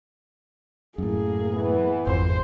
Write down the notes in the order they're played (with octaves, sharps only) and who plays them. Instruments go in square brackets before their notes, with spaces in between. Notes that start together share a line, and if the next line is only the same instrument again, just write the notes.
[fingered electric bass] F#2 A2 [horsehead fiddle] A#3 G#4
[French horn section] E3 B3
[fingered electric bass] G#1 [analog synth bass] F2 [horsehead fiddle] C5